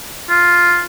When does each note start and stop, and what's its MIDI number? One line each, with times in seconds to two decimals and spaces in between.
0.30 0.84 65